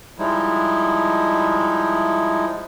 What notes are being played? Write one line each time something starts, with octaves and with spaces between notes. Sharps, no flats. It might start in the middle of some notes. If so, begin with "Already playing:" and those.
F3 G3 G#3 D#4 E4